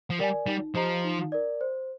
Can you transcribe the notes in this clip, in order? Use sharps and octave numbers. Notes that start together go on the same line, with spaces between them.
F3
G3 A#4 D5 G#5
G3 D#4
F3 G4 C5 D#5 A#5
D#4
A#4 D5
C5